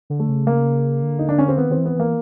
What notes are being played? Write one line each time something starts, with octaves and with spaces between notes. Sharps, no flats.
D3
A3
C#3
A#3
D3
D#4
D4
C#4
C4
D#3 B3
D#3 C4
E3
B3
E3 A#3